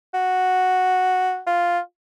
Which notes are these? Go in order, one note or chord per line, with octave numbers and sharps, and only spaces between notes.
F#4
F4